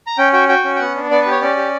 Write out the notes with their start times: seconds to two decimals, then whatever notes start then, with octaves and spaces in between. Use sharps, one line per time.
0.07 A#5
0.18 C#4 G5
0.33 F#4 G5
0.49 F#4 G5
0.64 C#4
0.75 G5
0.79 B3 F#5
0.96 D4
1.11 B3 D5
1.21 B4
1.26 G4
1.31 C#5
1.41 C#4 D5
1.57 G4